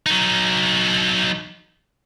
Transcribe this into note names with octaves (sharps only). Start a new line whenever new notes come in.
F#3 D#4